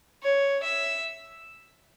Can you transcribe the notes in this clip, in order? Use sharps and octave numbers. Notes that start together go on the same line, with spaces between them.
C#5
E5